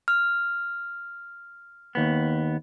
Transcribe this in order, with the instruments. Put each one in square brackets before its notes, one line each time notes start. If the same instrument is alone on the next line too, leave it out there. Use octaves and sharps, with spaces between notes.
[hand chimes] F6
[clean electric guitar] D#2 B3